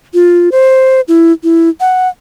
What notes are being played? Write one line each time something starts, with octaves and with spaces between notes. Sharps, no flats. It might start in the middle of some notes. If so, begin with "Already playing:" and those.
F4
C5
E4
E4
F#5